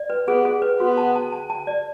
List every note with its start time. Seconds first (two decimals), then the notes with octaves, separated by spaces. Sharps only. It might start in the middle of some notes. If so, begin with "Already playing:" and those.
Already playing: D5
0.10 B4
0.27 B3 G#4
0.45 G#4
0.62 B4
0.80 B3 F#4
0.98 A5
1.16 A5
1.32 A5
1.50 A5
1.67 D5